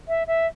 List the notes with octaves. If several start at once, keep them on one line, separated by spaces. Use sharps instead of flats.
E5
E5